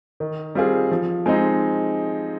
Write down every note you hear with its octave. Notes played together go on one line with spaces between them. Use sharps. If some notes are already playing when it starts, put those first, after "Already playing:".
D#3
G3 C4 F4 G#4
F3
G#3 C4 D#4